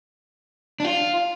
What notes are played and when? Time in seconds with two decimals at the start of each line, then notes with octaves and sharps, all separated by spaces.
0.80 D4
0.84 F4